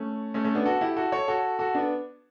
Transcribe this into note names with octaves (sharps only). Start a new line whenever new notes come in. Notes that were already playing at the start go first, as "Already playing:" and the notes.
Already playing: A3 C#4
A3 C#4
A3 C#4
B3 D4
F#4 A4
E4 G4
F#4 A4
A4 C#5
F#4 A4
F#4 A4
B3 D4